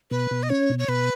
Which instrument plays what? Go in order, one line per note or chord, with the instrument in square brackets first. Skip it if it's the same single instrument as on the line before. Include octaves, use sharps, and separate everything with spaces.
[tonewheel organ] B2 [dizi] B4
[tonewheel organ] B2
[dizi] D#5
[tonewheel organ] C#4 [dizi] C#5
[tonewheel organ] B2
[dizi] C#5
[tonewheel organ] B2 [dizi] B4